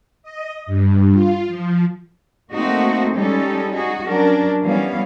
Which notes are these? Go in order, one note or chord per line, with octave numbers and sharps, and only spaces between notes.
D#5
G2
F4
F3
A3 A#3 C4 D#4 F#4
G3 G#3 C#4 D#4 G4 A4
D#4 F#4 G#4
F#3 C#4 D4 A#4
E3 G3 B3 C#4 F5